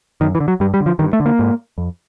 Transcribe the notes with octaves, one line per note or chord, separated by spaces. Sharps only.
F#2 D#3
E3
D3
F#3
G2 G3
G3
D3
F3
G2 D#3
A3
D3
A#3
G#2
F2